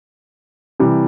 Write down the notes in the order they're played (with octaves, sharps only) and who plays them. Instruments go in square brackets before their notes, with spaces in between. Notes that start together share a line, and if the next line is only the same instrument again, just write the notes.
[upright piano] C3 E3 G3